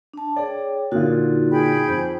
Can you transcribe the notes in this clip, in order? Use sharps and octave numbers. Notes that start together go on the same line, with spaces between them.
D4 A5
G#4 C#5 D5 G5
A#2 D3 D#4 F4 F#4
G#4 G5 B5
F2